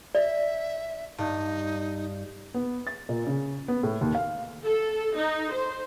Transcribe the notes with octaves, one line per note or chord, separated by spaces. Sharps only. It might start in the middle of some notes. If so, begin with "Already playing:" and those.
D5 E5
G2 D#4
B3
A6
A#2
C#3
B3
A2
D#2
F5
A4
D#4
C5